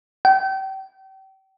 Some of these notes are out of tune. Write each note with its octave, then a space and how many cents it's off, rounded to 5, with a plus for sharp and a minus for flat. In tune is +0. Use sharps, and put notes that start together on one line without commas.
G5 -35